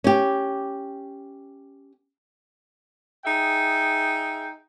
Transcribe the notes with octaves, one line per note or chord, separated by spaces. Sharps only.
C#4 G4
D#4 G#4 E5 G5